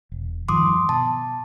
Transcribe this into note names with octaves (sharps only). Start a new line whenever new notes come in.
E1
G2 D#3 F3 C6 D6 D#6
B2 A5